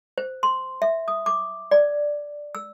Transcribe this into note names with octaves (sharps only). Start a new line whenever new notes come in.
C5
C6
E5
D#6
D6
D5
E6